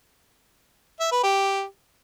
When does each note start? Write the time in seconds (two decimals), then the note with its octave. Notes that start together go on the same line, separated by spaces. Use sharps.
1.00 E5
1.12 B4
1.23 G4